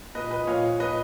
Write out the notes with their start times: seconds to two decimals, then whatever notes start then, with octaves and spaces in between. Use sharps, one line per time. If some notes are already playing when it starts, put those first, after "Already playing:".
0.15 A#2 B4 D#5
0.31 F3 B4 D#5
0.47 A#2 C#5 F5
0.64 F3
0.80 A#2 B4 D#5